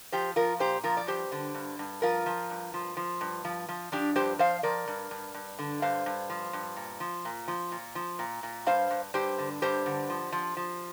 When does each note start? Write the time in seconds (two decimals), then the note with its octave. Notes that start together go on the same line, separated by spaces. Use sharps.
0.12 F3 G4 C5
0.36 F3 F4 A#4
0.59 A#2 G4 C5
0.83 F3 F4 A#4
0.97 D5
1.07 G2 G4 C5
1.32 D3
1.54 G2
1.79 G2
2.02 F3 F4 A#4
2.26 F3
2.50 G2
2.74 F3
2.97 F3
3.21 G2
3.45 F3
3.68 F3
3.92 F3 D4 G4
4.16 G2 G4 C5
4.39 F3 C5 F5
4.63 F3 A#4 D5
4.88 G2
5.11 G2
5.34 G2
5.59 D3
5.82 G2 C5 F5
6.06 G2
6.30 F3
6.53 G2
6.76 A#2
7.00 F3
7.25 A#2
7.48 F3
7.72 A#2
7.95 F3
8.19 A#2
8.43 A#2
8.66 G2 C5 F5
8.90 G2
9.14 G2 G4 C5
9.38 D3
9.62 G2 G4 C5
9.86 D3
10.10 F3
10.32 F3
10.57 F3